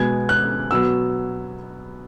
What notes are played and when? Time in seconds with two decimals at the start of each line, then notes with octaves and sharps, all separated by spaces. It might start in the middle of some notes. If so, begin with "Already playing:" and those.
Already playing: B2 G#3 B3 G#6
0.29 F#6
0.71 B2 F#3 B3 E6